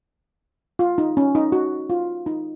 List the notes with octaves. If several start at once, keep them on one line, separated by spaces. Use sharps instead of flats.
F4
D#4
C#4
D#4
F#4
F4
D#4